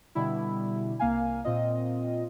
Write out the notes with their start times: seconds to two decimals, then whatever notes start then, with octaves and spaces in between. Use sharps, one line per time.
0.15 B2 D3 G3 E4
0.99 C2 A#3 F5 G#5
1.45 A#2 C4 F4 D#5